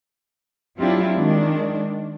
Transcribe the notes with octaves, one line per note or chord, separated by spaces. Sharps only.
F#3 C4 D4 E4 F4 G4
D#3 G#3 D4